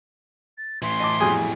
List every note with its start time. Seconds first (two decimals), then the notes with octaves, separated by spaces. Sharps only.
0.58 A6
0.82 A2 E3 C6
1.00 D#5 A5 D6
1.20 F2 B2 G3 G#4